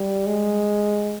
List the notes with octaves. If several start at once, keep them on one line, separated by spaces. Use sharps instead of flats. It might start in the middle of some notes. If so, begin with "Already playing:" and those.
Already playing: G3
G#3